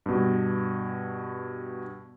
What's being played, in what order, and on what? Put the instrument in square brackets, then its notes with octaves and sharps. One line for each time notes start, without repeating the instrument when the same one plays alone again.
[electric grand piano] G2 B2